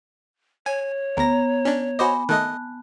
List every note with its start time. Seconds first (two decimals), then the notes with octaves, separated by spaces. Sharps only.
0.66 C#5 G#5
1.17 D2 B3 A#5 A#6
1.65 C#4 D4
1.99 F#4 C5 D#5 G#5 B5 D6
2.29 D#3 A3 D#5 A5 F#6